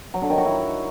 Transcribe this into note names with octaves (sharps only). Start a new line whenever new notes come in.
F#3
D3
D#3
F#4
E4